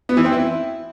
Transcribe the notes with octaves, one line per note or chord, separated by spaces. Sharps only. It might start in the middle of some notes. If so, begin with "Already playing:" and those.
B3
E3
C4
E4